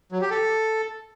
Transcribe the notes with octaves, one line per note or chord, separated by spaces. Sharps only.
F#3
G4
A4